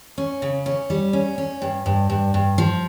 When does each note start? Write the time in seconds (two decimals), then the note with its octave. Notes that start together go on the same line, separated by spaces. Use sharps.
0.18 C#4
0.42 C#3
0.66 C#4
0.90 G3
1.13 C#4
1.38 C#4
1.62 G2
1.86 G2
2.10 G2
2.34 G2
2.58 F3